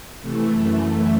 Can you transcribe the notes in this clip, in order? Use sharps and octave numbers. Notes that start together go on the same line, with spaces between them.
C3 E3 A3
F#2 E3 A3 A4